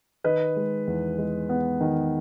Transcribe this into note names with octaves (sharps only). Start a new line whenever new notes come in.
D#3 B4 D#5
G#3
E2
G#3
B3
D#3